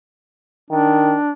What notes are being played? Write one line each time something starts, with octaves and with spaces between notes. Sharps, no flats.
D#3 D4